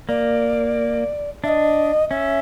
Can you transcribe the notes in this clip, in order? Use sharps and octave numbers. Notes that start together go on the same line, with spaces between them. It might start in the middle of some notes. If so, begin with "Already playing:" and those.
A#3 D5
D4 D#5 E5
C#4 E5